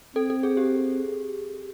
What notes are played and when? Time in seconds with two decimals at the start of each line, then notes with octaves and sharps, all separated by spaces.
0.16 C4 A4
0.30 A4
0.43 G#4
0.57 G4